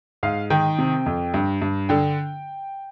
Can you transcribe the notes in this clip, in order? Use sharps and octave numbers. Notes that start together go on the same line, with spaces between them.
G#2 F5
D#3 G5
C3
F2
G2
G2
D3 G5